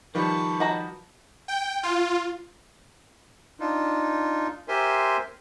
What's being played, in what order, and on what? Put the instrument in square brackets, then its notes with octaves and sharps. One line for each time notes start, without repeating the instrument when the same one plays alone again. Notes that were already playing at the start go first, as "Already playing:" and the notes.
[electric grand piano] D#3 F3 G3 [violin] B4 A5 [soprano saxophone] C#6
[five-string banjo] F#4 A#5 B5 [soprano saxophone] D#5
[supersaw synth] G5
F4
[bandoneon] D4 D#4 F4
G4 A#4 C5 E5 G#5 C6